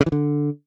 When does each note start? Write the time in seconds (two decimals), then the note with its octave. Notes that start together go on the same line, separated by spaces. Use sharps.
0.01 C#3
0.06 E3
0.12 D3